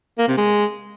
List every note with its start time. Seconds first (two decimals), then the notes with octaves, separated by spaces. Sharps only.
0.19 A#3
0.28 C3
0.37 G#3